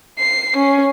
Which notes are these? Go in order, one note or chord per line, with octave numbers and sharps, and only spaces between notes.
C7
C#4